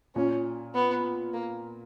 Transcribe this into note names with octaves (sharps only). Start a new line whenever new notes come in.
A#2 C#4
B3
A#3